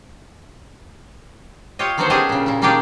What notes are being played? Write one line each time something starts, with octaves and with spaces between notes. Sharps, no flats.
F4 G4 C#5 D#5
D3 D#3 F#3 B3 F#4 C5
C#4 D4 G4 G#4 D#5
A#2 C#3
A#2 E4
D#3 A#3 C#4 D4 G4 G#4